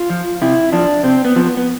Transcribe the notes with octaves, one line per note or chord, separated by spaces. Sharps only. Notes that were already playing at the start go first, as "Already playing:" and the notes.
Already playing: F4
F3
C3 E4
F3 D4
C3 C4
B3
F3
B3
B3